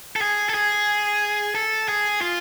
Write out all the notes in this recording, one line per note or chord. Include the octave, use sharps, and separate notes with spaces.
A4
G#4
A4
G#4
A4
G#4
F4